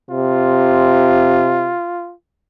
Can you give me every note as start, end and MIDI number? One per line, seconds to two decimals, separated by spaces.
0.11 1.73 48
0.11 2.14 65